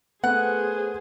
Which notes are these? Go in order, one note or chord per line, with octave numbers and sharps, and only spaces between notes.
A3 B3 G#4 C5 F#5